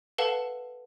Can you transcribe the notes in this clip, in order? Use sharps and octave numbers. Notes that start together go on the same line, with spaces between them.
A4 B4 F5 F#5 A5